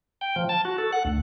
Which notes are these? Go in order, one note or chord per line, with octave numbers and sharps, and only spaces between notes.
G5
F3
A5
F#4
A4
F#5
D2